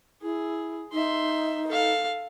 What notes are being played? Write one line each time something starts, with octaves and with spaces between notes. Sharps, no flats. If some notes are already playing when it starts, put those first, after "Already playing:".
E4 G#4
D#4 E5 C6
A4 F5